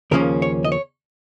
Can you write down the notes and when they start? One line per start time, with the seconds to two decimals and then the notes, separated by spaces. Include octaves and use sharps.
0.11 D#2 C#3 F3 A#3 C#4 A#4
0.42 C#5
0.64 D#5
0.72 C#5